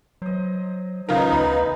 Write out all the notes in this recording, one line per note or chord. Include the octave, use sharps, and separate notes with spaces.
F#3 C5 D#5
C#3 B3 D#4 F4 A#4 C5
D2 B2 D3 E3 B5